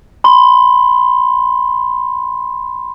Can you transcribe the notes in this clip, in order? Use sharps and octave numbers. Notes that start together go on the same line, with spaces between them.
B5 C6